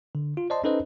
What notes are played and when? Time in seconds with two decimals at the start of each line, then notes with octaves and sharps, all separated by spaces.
0.15 D3
0.37 F4
0.50 C5 D5 D#5 A5 C6
0.64 C#4 D#4 A4 B4 C5 D#5